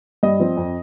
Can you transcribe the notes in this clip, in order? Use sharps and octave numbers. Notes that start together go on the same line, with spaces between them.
G2 D#5
F3 C4
F2